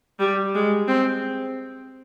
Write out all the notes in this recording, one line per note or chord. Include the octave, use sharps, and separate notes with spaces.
G3
G#3
C4